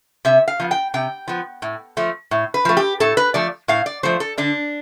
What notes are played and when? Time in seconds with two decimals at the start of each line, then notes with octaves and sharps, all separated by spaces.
0.25 C3 E5
0.48 F5
0.60 F3 B3
0.71 G5
0.94 C3 G5
1.28 F3 B3
1.62 A2
1.97 F3 A3
2.31 A2
2.54 B4
2.65 F3 A3
2.77 G4
3.00 A2 A4
3.17 B4
3.34 F3 A3 D5
3.68 A2 F5
3.86 D5
4.03 F3 A3 C5
4.20 A4
4.38 D3 D4